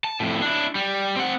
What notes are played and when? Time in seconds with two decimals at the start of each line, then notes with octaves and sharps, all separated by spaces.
0.04 A5
0.20 F2 A2
0.42 D4 E4
0.75 G3
1.16 C4 F#5